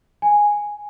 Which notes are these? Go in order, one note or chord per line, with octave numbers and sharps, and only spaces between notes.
G#5